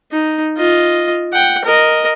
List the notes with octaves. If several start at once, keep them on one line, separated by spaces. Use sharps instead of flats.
D#4
F4 D#5
F#5 G5
A#4 D#5